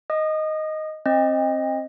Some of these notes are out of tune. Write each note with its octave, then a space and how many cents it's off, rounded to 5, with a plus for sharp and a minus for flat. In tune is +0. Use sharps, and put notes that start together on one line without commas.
D#5 +0 D#6 -30
C4 +30 D#5 +0